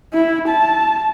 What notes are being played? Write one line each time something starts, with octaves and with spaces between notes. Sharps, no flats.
E4
A5